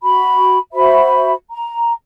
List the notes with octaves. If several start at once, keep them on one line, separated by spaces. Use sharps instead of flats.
F#4 B5
F#4 C5 E5 B5
A#5